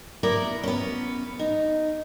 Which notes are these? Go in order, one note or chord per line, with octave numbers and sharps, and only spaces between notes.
B3 E4 A#4 D5
B3 C#4
D#4